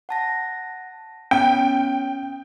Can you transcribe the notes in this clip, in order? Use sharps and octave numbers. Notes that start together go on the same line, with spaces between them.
F#5 A5 A#6
B3 C#4 G5